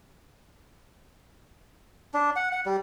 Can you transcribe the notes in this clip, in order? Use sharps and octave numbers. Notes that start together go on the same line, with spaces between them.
D4
F#5
F#5
G3